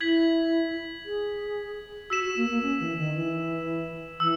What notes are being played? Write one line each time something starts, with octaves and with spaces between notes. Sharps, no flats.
E4 G#6 B6 F#7
G#4
F#4 E6 B6 E7
F#4
A#3
A#3
C#4
E3
D#3
E3
E3 E6